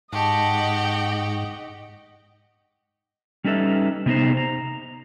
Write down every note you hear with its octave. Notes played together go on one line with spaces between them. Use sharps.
G#2 G4 D#5 F#5 G5 A5 C#6
G3 C#4 D#4 A4 B4 E5
C3 B3 D#4 C5
A#5